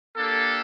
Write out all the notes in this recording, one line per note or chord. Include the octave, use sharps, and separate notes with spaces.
A#3 D4 G4 A4